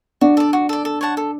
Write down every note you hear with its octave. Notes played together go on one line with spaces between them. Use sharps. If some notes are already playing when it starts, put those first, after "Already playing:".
D4 F#4
A4 D5
F#4
A4 D5
A4
C#5 F#5 A5
A4